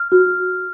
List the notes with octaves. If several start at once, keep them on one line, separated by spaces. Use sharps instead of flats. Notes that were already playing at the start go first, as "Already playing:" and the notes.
Already playing: F6
F#4